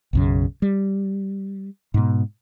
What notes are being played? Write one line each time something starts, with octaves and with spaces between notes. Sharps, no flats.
B1 F#2 C#3
G3
G#2 B2